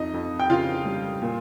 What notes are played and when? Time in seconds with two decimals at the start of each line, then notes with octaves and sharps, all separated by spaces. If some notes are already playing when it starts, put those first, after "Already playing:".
Already playing: F2 D#4 D#5
0.14 F2
0.39 G5
0.49 C#3 F4 F5
0.86 G3
1.22 A#2